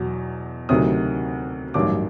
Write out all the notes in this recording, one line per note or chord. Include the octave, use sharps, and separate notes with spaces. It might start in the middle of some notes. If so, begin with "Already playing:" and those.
Already playing: E2 B2 F#3
D2 C3 D#3 F#3 D#6
A1 G2 D#3 F#3 D6